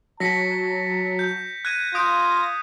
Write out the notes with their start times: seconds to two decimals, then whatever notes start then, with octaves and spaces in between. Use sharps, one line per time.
0.20 F#3 A5 A#6 B6 C#7
1.19 G6
1.65 F#6 G#6 A#6 D#7
1.95 F4 D#6 G6 D7